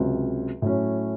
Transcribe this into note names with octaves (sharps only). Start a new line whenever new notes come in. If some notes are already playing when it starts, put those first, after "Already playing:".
Already playing: C#2 C3 F#3 C4
A2 F#3 C#4